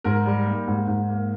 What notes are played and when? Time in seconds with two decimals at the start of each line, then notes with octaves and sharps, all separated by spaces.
0.04 G#2 A#4
0.26 G3
0.46 A#3
0.67 G#2
0.88 G#2
1.09 A#3